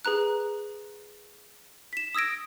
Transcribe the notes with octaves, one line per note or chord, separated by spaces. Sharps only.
G#4 B4 A#5 F#6
B6 E7
D#6 E6 G#6 A#6 D7